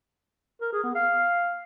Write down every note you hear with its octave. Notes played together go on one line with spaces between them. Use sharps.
A#4
G#4
B3
F5